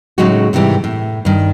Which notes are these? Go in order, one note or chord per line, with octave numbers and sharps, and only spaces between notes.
A2 C#3 F#3 G#3 D#4 F#4
G#2 C3 D#3 E3 G3
A2
G2 D#3